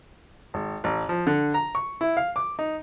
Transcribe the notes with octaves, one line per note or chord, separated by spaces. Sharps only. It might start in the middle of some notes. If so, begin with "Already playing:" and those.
G#1
A1
F3
D3
A#5
C#6
E4
F5
D6
D#4